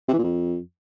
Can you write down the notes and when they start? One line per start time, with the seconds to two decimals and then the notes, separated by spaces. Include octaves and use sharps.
0.08 C3
0.13 E3
0.18 A#2
0.24 F2